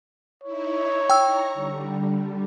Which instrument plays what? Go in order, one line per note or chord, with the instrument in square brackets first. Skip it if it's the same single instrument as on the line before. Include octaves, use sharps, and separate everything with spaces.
[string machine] D#4 E4 [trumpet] C#5
[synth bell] G5 E6 [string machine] A#5 C#6
[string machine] D3 G3